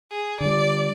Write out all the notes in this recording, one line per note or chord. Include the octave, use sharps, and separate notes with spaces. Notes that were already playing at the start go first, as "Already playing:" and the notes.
G#4
D3 G3 D5